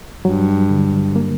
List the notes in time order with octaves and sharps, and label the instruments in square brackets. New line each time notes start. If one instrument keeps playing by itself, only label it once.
[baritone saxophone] G2 [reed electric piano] F#3
[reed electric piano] D3
A#3